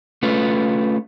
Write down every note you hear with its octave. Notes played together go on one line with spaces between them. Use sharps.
A3 C#4 F4 B4